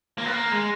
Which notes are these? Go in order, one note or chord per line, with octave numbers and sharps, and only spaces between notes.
A#3
B3
A#3
G#3